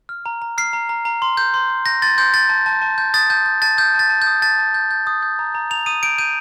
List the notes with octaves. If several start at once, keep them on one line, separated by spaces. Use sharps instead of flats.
F6
A#5
A#5
F6 C7
A#5
A#5
A#5
C6
G6
C6
G6
G6 A#6
C6 A6
C6 G6
C6 A6
A5
A5
A5
G6
D#6 A6
A5 G6
G6
A5 A6
D#6 G6
A5 A6
A5
G6
D#6
A5 A6
A5
G6
G6
D#6
G6
A#5
A#5
A#5 F7
D#6 D#7
G6 D7
G6 D#7